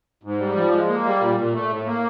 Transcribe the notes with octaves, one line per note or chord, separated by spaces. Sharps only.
G#2
G3
F3
G#3
A#3
G3
A#2
A#2
A3
A2
A#3